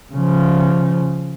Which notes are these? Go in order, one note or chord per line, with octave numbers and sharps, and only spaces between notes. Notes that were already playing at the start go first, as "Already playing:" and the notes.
C#3 F3